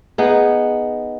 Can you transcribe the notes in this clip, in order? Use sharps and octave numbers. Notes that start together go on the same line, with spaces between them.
B3 D#4 G#4